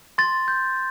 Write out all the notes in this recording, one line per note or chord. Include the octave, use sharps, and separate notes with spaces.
C6 A6
G6